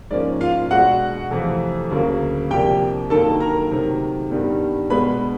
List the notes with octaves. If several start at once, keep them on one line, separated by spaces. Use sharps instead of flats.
G#2 F3 A#3 C#4 D5
F4 F5
B2 G#3 B3 D4 F#4 F#5
F2 C3 E3 A3
D2 C#3 F#3 A#3
C2 C3 F3 A#3 D4 G4 G5
G2 D#3 F#3 A#3 A4 A5
A#4 A#5
C3 D#3 F#3 A3
G2 D#3 G3 B3
B2 G#3 B3 D4 B4 B5